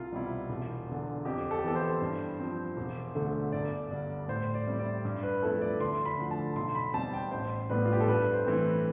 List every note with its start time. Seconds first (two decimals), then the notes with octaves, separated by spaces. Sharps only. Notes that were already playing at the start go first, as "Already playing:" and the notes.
Already playing: C2 F4
0.12 B2 G3 C4 E4
0.49 E1
0.88 E2 D3
1.25 F2 G4
1.51 A4
1.59 G4
1.64 E3 B3 A4
1.75 C5
2.01 G2
2.40 F3 C4
2.77 E1
3.15 D2 D3 A3
3.52 G1 D5
3.91 G2 D3 G3 D4
4.28 A2 C5
4.55 D5
4.67 G3 C4 E4
4.79 D5
5.05 G2
5.23 B4
5.42 F3 A3 C4 E4 A4
5.62 D5
5.80 D2 C6
6.06 B5
6.18 D3 F3 A3
6.31 A5
6.56 B1 C6
6.75 B5
6.93 B2 G3 C4 A5
7.14 G5
7.31 A1 C5
7.70 A2 G3 B3 D4 B4
7.86 F4
7.93 G4
8.01 A4
8.07 G2 B4
8.33 C5
8.46 E3 A3 C4 E4